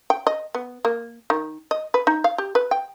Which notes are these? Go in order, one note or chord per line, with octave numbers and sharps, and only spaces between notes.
G5
D#5
B3
A#3
D#3
D#5
B4
D#4
F5
G4
B4
G5